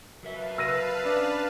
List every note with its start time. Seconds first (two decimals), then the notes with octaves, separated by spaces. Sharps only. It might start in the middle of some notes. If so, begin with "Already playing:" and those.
0.23 F#3 A#4 B4 E5 F5 A5
0.58 E6 A#6 D#7
1.05 C#4 D4